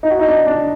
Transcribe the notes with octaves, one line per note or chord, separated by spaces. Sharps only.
D#4
F#4
D#4
D4
D4